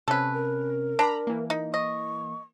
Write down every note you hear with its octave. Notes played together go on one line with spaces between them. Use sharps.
C3 C#4 A4 B4
A#4
D4 A#5 B5
E3 A#3
D#4
D#5 C#6